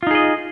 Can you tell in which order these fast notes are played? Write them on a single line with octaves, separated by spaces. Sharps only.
F4 D#4 G#4 D#5